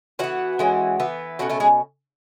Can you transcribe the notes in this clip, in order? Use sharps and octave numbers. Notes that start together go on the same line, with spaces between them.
E3 B3 F#4 F#5
E3 G#3 C#4
E3 B3
B2 A3 C#4 F#4 F#5
A3 A4
G#3 G#4